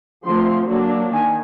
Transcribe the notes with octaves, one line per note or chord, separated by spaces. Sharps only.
D3 F3 A3 C4 C6
F#3 A#3 D4
D#3 G#5